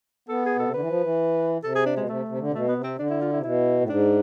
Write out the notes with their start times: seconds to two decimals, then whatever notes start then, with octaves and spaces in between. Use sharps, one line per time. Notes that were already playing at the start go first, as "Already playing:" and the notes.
0.29 B3 A4
0.46 G#4
0.56 B2
0.59 A4
0.65 C3
0.73 D3 B4
0.80 E3
0.88 F3
1.04 E3
1.63 C3 A4
1.75 G#4
1.86 D4
1.97 B2 G#3
2.08 C3 A3
2.29 C3
2.39 D3
2.47 C3
2.53 B2 A3
2.68 B3
2.76 C3
2.84 C4
2.98 D3 D4
3.10 E4
3.21 F4
3.33 E4
3.37 C3
3.43 B2 E4
3.81 A2
3.88 G#2 D4